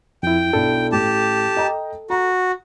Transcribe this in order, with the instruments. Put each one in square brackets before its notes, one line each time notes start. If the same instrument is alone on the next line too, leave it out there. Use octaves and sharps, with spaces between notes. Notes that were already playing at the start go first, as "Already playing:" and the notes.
[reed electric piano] F2 E4 [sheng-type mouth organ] G5
[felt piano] B1 D4 E4 [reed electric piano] A4
[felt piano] A1 [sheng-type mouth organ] G4 A5
[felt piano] D#5 G5 A#5
[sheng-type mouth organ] F#4 [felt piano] A#5